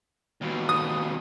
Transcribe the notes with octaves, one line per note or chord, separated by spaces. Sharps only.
D#2 B2
D#6